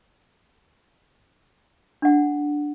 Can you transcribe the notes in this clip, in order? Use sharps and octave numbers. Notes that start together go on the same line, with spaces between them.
D4 F#5